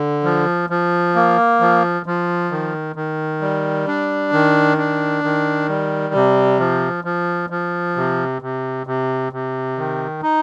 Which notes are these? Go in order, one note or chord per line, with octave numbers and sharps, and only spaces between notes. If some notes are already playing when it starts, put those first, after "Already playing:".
Already playing: D3
F3
F3
A#3
F3
F3
D#3
D#3
G3
D4
D#3
D4
D#3
G3
C3
F3
F3
F3
C3
C3
C3
C3
D#3
D#4